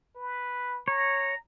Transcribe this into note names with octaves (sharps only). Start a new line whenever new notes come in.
B4
C#5 A#5